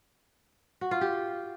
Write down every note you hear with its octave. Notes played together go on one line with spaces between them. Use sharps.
F#4
F4
G4